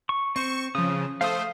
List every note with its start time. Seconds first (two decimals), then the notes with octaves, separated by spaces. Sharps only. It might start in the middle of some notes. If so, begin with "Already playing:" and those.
0.09 C#6
0.36 C4 C5 C#6
0.75 C#3 F3 D#6
1.21 A3 C5 F5 D#6